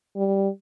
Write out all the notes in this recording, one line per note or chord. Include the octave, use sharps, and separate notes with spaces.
G3